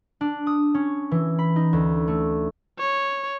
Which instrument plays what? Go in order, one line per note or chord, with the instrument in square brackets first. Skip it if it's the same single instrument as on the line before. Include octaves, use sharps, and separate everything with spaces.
[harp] D4
D#6
C#4
E3
B5
D#4
D2
A3
[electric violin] C#5